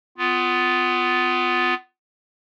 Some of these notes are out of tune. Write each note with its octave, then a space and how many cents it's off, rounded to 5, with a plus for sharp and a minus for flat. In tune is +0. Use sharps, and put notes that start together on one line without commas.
B3 +20 F4 +0